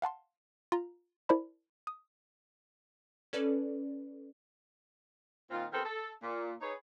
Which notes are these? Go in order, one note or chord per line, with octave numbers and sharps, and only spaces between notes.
F5 F#5 A5 C6
F4 A#5
E4 A#4 C5 D5 A5 B5
D#6
C#4 A4 B4 D5
A#2 D#3 C4 F4
E3 B3 C4 G4 A4 A#4
A4
A#2
D#4 G#4 B4 C#5